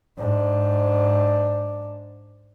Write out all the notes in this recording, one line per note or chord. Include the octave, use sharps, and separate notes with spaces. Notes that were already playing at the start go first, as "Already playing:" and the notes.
G#2 D4